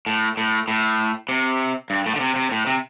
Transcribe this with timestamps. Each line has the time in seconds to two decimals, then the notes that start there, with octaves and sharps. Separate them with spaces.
0.06 A2
0.37 A2
0.68 A2
1.29 C3
1.90 G2
2.06 A2
2.16 D3
2.21 C3
2.36 C3
2.51 A2
2.67 C3